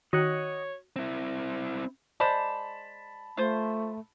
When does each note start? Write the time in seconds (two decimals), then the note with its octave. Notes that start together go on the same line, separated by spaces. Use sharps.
0.13 D#3 F#4 C#5 D#5 F#5
0.96 C4 E4
2.20 G#3 C5 D5 A5 B5 E7
3.37 A3 F4 C5